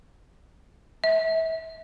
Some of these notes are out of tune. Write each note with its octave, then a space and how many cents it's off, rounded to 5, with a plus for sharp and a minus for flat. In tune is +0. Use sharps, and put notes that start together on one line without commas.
E5 -30